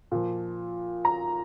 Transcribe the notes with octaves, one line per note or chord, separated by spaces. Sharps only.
A#2 F3
A#5